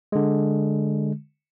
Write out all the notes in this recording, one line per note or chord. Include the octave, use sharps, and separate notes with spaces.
D3 G#3